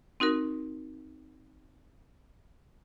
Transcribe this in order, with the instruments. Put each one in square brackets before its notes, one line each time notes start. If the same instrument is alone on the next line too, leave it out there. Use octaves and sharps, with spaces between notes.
[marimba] C4 D#4 F#4 A#4